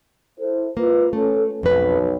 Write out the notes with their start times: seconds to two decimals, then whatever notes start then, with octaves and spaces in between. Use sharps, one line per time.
0.40 E4 A4 C5
0.77 A#3 F4 B4
1.13 A3 C#4 A4
1.63 B1 F2 B4